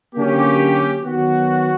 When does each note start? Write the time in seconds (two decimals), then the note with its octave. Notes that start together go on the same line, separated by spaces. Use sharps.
0.14 D3 F#3 A#3 C#4 G4
1.02 D#3 F#3 B3 F#4